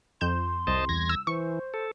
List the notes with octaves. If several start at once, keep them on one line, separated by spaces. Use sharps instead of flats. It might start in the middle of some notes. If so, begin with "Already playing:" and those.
F2 C6 G6 E7
C2 C5 D#5 A5
E2 G#6 A#6
E6
E3 C5 C#6
A4